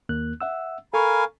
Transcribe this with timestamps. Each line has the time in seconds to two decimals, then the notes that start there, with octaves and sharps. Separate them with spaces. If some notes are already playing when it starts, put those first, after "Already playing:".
0.09 D#2 A#3 F#6
0.41 E5 F#5 E6
0.94 A4 A#4 F5 G#5 B5 C#6